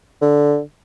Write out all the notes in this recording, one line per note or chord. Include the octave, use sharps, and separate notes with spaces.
D3